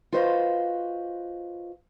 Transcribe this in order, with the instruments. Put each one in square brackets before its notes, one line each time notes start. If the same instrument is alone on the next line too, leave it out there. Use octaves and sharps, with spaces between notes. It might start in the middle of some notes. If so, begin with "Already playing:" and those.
[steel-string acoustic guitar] F4 F#4 B4 C5 D#5 F5